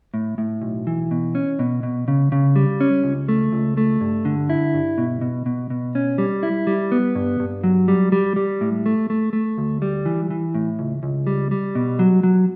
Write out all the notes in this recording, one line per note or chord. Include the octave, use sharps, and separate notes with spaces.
A2
A2
B1
E3
B2
C#4
B2
B2
C#3
C#3
G3
C#4
C#2
A3
C#2
A3
G2
D3
E4
G2
B2
B2
B2
B2
C#4
G3
E4
G3
B3
G2
G2
F#3
G3
G3
G3
A2
A3
A3
A3
D2
G3
E3
E3
A2
C#2
C#2
G3
G3
B2
F#3
F#3